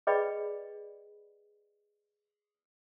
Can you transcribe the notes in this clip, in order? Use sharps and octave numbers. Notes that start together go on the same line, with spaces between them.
G#4 B4 D5 D#5 G5 B5